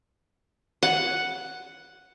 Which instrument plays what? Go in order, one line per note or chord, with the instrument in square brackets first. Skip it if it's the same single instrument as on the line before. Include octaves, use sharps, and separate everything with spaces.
[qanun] F#5